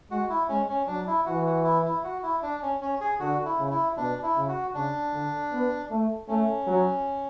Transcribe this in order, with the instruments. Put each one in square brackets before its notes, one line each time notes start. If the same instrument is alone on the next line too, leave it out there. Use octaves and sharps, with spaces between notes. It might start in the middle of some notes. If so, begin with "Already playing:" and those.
[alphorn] G#3 [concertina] F#4
[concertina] E4
[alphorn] G#3 [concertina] C#4
[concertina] C#4
[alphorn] F#3 [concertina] D4
[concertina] E4
[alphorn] E3 [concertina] F#4
[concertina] F#4
E4
E4
F#4
E4
D4
C#4
C#4
G#4
[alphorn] D3 [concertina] F#4
[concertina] E4
[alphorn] C#3
[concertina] E4
[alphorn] B2 [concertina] D4
[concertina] E4
[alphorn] C#3
[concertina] F#4
[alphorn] C#3 [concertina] D4
[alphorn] D3
B3
A3
[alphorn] A3 [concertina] C#4
[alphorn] F#3